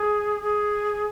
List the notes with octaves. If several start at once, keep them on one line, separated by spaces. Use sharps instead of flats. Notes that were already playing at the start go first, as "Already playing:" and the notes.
Already playing: G#4
G#4